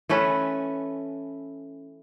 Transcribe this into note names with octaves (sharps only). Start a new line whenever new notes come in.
E3 A3 C#4 B4